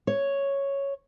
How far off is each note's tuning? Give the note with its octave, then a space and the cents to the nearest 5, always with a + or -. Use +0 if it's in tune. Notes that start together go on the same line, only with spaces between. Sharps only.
C#5 +0